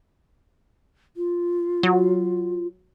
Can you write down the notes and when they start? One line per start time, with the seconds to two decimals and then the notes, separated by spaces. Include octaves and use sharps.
1.17 F4
1.83 F#3